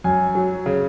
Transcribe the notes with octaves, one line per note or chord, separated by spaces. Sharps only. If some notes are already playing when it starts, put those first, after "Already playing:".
F#2 G#5
F#3
C#3